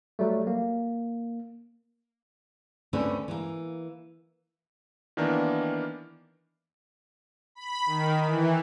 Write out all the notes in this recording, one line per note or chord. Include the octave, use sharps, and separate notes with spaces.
F#3 G3 A3
A#3
D2 D3 A3 C4 C#4 B4
E3 A#3
D#3 E3 A#3 B3 D4 A#4
B5
D#3
E3